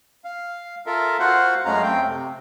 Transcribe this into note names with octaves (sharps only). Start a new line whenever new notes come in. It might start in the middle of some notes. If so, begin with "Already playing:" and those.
F5
F4 A4 A#4 E5
F4 F#4 C5 F5 F#5
F#2 G#3 A3 C#4 F5 A#5
A3 C4 G5
C3